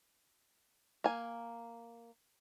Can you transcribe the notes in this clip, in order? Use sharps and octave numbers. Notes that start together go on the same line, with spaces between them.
A#3 G#5